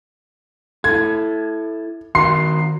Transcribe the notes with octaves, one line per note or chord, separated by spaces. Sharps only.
E4 A4 G#6
D#3 F#4 A#4 C6 C7